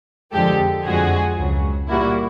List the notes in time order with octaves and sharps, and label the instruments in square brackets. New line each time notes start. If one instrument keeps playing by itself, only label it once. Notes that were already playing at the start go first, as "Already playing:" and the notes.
[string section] F2 D3 F3 G#3 G4 A4
F2 D3 F3 G#3 F#4 G#4
C#2 C#3 F#3
A#2 G3 A#3 E4 F#4